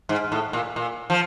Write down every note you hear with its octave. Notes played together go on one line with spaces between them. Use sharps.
G#2
A2
A#2
A#2
F3